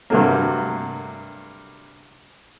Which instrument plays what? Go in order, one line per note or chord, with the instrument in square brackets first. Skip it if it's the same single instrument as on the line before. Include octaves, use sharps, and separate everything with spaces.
[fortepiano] G2 C3 F#3 A3 A#3